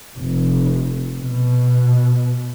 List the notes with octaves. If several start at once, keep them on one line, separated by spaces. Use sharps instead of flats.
F1
B2